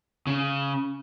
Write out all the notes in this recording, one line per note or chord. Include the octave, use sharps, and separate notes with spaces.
C#3